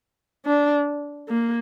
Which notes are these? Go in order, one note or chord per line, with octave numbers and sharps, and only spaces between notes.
D4
A#3